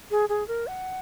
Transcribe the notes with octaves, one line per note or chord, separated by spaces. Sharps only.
G#4
G#4
A#4
F#5